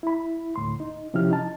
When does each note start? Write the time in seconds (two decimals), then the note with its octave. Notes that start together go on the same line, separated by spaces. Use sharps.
0.03 E4 B5
0.56 D2 A2 C6
0.80 D#4
1.14 C3 F3 C#4 E4 G4 F6
1.31 D#4 A5